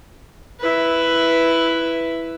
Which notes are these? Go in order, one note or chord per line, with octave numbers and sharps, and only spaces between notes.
E4 B4